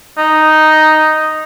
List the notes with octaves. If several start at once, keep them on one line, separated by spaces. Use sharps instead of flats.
D#4